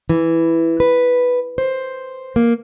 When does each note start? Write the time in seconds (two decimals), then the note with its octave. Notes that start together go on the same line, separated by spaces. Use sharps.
0.09 E3
0.80 B4
1.58 C5
2.36 A#3